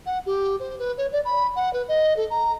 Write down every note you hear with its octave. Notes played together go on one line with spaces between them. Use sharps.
F#5
G4
C5
B4
C#5
D5
B5
F#5
B4
D#5
A4
A#5